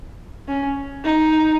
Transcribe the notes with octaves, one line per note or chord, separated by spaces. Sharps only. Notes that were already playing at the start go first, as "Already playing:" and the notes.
C#4
D#4